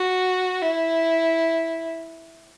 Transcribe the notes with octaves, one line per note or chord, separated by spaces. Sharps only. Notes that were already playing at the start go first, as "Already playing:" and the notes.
Already playing: F#4
E4